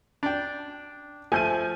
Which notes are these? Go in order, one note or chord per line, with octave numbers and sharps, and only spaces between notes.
D4 G5
F3 A3 G#5 G6 D#7